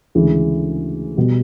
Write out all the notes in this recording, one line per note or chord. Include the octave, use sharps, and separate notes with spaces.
D2 C#3 E3 G#3
B2 G3